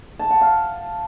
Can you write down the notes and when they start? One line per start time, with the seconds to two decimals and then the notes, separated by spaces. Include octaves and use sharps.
0.19 A5
0.30 F#5
0.41 F5